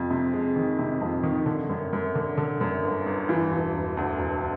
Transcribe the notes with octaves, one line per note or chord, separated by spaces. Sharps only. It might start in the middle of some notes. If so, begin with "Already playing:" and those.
Already playing: F2 C3
C3
G#3
D#3
C3
F2
D#3
D3
F#2
F#2
D3
D3
F#2
G1
G1
E3
E1
E1
D2
E1